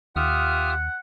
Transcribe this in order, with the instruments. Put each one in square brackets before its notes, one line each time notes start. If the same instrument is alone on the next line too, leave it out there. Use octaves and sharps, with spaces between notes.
[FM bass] D#2 [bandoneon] F4 G4 E5 [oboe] F#5 [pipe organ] D#6 F6